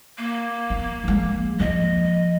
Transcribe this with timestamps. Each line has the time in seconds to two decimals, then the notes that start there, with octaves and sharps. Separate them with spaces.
0.18 A#3
0.70 B3
1.04 F3 G#3
1.60 F3 A#3 D#5